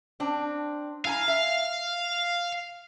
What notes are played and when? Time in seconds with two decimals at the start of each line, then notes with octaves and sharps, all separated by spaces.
0.20 C4 D4
1.05 E4 F5 G#5 A#5
1.28 E5